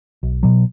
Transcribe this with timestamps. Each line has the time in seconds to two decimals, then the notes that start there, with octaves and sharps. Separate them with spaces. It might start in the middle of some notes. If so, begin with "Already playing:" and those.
0.23 B1
0.43 B2 F#3